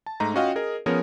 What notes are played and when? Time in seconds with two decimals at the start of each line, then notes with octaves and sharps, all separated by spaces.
0.06 A5
0.20 G#2 A3 D#4 A#5
0.34 C#4 F4 F#4 D#5 F5 G5
0.56 G#4 A#4 D#5
0.86 F3 B3 C#4 G#4 A#4 C#5